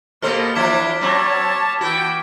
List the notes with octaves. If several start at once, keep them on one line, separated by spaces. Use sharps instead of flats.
B2 A#3 G4 A4 C5 F6
E3 F3 D4 E4 D6 G#6 B6
F#3 C4 C#5 A5
E3 F#4 G5